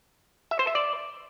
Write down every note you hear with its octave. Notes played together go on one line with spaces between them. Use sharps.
E5
C5
E5
D5